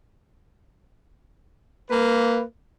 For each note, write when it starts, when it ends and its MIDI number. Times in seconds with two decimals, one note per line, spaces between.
1.90 2.42 58
1.90 2.42 71